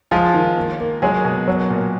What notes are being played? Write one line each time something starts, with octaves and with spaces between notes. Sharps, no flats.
F3 G#3 F4
D#3
A#3
A#3
F#3 G#3 G#4
B2
F#3
A#2